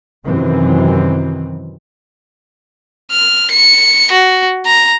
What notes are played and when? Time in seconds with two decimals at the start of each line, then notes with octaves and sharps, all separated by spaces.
0.25 F#2 C3 D#3 E3 C4
3.11 F6
3.51 C#7
4.12 F#4
4.66 A#5